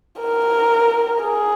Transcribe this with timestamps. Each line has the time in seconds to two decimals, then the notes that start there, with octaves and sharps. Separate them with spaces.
0.20 A#4
1.24 G#4